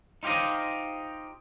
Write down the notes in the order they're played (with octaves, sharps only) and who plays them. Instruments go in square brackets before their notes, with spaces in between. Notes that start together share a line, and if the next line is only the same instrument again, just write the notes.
[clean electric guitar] D#4 F4 G4 C5 D#5